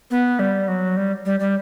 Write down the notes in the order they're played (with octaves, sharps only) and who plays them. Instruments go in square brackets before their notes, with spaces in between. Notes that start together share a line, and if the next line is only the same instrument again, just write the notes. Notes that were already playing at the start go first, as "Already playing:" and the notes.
[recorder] B3
G3
F#3
G3
G3
G3